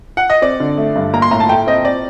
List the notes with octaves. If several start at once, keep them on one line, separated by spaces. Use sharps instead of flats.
F#5
D#5
C4 D5
D3
A3
G2
A#3 A#5
C6
A2 A#5
A5
A3 G5
C4 D#5
C4 D5